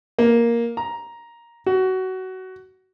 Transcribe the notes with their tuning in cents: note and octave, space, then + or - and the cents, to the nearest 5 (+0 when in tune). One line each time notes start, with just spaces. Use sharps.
A#3 +5
A#5 +10
F#4 +20